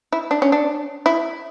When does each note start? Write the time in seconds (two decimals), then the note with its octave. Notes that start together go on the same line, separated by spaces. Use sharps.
0.12 E4
0.31 D4
0.42 C#4
0.52 D4
1.06 E4